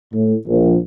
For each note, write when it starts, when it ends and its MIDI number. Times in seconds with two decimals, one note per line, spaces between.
0.14 0.35 45
0.48 0.76 34